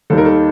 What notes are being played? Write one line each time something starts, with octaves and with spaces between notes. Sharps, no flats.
D#2 D#3 G3 A4
A#4
A4